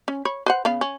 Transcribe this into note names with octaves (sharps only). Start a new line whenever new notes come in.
C#4
C#5 B5
B4 C5 F#5
C#3 B3 F5
C#4